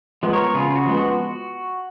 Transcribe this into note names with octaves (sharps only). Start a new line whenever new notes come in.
F3 G#3 B3
A#4 C#5
C#3 F4 G#4
F4
F#4
F3 G#3 B3
F#4